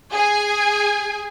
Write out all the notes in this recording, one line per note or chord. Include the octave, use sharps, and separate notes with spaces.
G#4 G#5